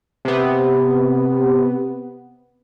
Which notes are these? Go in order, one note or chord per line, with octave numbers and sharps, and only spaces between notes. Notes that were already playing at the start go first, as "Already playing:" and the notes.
C3 B3